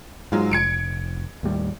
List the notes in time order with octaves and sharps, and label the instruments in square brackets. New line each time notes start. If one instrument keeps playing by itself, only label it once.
[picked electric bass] G#2 [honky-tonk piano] F#3 G#3 F4
[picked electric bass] F1 [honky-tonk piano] G#6 C#7 D7
[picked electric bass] D#2 A2 G3